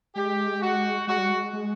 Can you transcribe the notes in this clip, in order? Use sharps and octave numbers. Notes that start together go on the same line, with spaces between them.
G#3 G4
F#4
G#3 F#4
G3
G#3
G#3